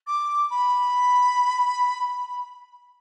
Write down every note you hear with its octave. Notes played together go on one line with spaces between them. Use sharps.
D6
B5